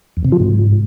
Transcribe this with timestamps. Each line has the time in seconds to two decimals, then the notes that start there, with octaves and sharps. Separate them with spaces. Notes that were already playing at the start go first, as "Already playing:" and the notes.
0.17 E2
0.25 C3
0.32 F3
0.40 G#2